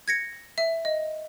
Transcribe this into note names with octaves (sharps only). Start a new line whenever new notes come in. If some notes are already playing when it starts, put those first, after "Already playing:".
G#6 A#6 C#7
E5
D#5